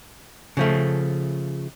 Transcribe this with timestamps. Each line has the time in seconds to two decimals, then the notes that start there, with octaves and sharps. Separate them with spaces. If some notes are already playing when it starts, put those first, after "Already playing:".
0.57 C#3 F3 A3